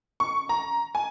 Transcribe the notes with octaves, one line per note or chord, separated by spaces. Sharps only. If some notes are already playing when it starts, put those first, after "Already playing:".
C#6
A#5
G#5